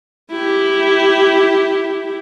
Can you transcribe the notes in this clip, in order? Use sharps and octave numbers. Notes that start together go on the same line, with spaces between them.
E4 G4